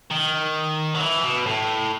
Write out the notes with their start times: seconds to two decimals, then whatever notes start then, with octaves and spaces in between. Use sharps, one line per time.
0.11 D#3
0.94 F#3
1.01 E3
1.24 B2
1.46 A2